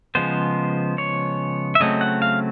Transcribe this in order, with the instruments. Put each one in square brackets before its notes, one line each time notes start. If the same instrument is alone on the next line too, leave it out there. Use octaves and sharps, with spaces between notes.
[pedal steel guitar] C#3 F3 G#3 B3 C5
C#5
E5
C#3 F#3 A3 C4 D#5
F#5
F5